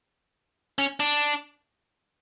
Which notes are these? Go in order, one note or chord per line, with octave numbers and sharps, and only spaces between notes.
C#4
D4